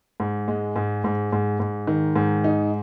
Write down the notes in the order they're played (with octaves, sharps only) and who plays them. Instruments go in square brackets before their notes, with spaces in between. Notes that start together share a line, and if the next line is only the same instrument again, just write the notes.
[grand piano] G#2
G#3
G#2
G#2
G#2
G#2
D#3
G#2
D#4